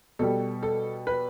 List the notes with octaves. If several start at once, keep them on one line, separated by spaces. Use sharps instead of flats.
B2 G3 A4
A4
B4